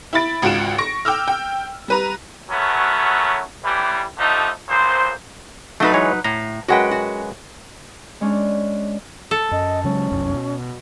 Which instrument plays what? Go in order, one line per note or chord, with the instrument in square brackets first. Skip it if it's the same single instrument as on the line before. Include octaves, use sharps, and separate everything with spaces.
[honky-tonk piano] E4 B5 A6 D7
G#1 C#2 F4 F#4 D7 E7
C#6 A#6 D7
G5 D6 E6 F6
G5
G3 B4 A#5
[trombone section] F#2 F#3 A3 B3 C#4
A1 E3 G3
D3 F3 A3 D#4 G4
B1 A#2 C5
[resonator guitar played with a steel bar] F#3 D#4 B4 [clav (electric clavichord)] A3 A5
[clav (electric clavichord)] E3 G#3 C#5
[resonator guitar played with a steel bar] A2 [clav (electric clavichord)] A#5
[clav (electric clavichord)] F#2 G#3 B4 [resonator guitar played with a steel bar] F#4 F#5 G5
[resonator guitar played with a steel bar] F#4
[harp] G#3 C#4 D4
[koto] A4
[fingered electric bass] F#2 [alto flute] D#5
[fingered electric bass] C#3 F#3 G#3 [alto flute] C#4
[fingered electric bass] F1 C2 F#2
B2